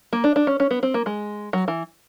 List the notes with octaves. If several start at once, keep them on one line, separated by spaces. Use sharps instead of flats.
A#3
D4
D4
C#4
C#4
B3
C4
A#3
G#3
F#3
E3